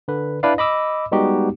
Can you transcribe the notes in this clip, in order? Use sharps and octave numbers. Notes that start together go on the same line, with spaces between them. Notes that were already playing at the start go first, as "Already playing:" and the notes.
D3 B4
D4 E4 B4 D5 F5
D#5 B5 D6 E6
G3 G#3 B3 D#4 F#4 G4